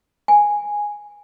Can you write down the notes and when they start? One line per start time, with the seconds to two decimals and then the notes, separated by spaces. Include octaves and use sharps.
0.28 G#5